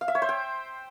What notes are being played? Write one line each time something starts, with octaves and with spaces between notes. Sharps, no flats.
F5
E5
C#5
C5
G5